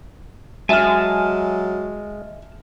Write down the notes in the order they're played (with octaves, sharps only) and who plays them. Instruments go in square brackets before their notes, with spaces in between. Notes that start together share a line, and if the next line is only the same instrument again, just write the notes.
[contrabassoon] F#3 [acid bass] G#3 [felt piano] E5 F6 [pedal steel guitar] G#5 A5